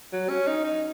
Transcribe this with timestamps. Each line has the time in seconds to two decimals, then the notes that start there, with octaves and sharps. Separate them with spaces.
0.13 F#3
0.29 C#4
0.47 D#4
0.64 D#4